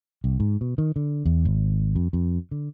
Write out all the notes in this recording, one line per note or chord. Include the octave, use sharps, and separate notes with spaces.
C2
G#2
B2
D#3
D3
E2
G#1
F2
F2
D3